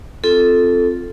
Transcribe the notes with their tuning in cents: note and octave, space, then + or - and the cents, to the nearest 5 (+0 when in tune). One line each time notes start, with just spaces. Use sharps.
C4 +0 F4 +0 A4 -5